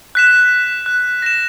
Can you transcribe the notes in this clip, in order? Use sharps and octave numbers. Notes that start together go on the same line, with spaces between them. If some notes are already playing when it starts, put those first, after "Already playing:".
F#6 B6 E7
F#6
A#6 E7